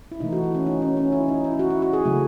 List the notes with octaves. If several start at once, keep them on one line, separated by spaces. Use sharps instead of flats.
E4
C3 E3 A3 D#4
F#4
E4
C#4
D#4
C#4
C#4
E4
D#4
E4
F#4
E4
F#4
G#4
C#3 F#3 A3